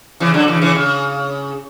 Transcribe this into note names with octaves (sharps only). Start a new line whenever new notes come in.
C#3 E3
D3 F#3
C#3 E3
C#3 E3
C#3